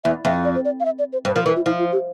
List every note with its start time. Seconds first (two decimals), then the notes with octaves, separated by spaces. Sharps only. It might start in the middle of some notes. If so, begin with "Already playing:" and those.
0.04 E2 E5
0.25 F2 E5
0.45 D5
0.55 C5
0.65 D5
0.80 F5
0.85 E5
0.99 D5
1.13 C5
1.25 G2 C5
1.35 F3 A#4
1.46 E3 A#4
1.56 F4
1.66 F3 E4
1.79 F4
1.92 G4